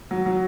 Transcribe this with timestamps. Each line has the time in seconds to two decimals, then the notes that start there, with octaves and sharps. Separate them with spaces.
0.11 F#3
0.26 F#3